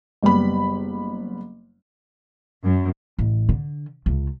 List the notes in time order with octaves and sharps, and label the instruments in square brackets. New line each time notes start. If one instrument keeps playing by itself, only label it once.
[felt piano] F#1 G3 B3 B5
[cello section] F#2
[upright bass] A1
D3
C#2